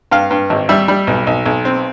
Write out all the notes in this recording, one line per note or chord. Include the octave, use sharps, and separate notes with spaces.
G2 F5
G2
G#1
G3 E5
G3
B1
B1
B1
C4